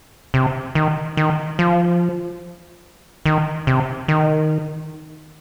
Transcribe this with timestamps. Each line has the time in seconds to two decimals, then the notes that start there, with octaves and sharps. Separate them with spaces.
0.34 C3
0.75 D#3
1.17 D#3
1.59 F3
3.26 D#3
3.67 C3
4.08 D#3